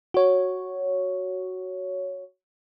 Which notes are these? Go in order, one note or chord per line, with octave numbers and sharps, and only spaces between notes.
F#4 C#5